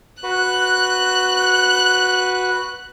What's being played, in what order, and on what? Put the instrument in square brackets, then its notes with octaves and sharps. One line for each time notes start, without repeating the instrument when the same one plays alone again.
[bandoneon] F#4 B4 [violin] F#6